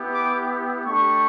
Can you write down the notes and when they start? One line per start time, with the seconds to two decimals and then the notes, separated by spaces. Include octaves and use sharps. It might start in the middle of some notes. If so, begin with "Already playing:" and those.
Already playing: B3 E4 G4
0.14 D6
0.85 A3 D4 G4 C#6